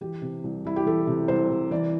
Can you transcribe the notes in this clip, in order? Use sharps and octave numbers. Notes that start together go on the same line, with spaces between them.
E3 G4
C3
C2
C2 E4
G4
E3 A4
C3
C2 C5
C2
E3 D5